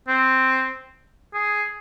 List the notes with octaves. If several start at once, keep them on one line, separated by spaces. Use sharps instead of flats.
C4
G#4